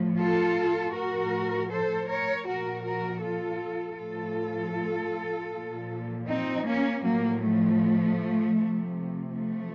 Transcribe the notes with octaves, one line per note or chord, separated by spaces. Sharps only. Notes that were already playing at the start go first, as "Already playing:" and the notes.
Already playing: A2 F3
F4 A4
A2 F3 F#4 A#4
A4 C5
A#4 C#5
A#2 F3 F#4 A#4
F#4 A#4
F4 A4
A2 F3 F4 A4
A#2 F3
C4 D#4
A#3 C#4
A2 F3 F#3 A#3
F3 A3
C3 F3
F3 A3